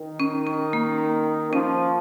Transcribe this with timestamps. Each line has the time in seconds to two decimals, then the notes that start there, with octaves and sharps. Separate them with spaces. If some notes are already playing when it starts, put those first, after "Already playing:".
Already playing: D#3
0.20 C#4
0.47 C#4
0.73 A#3
1.53 F3 C#4